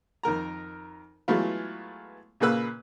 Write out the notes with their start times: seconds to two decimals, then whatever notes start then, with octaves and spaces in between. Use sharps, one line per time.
0.23 F2 D#3 A#4 A#5
1.28 E3 F#3 G#3 A3 B3 F4
2.40 A#2 C#3 A#3 B4 E6 F#6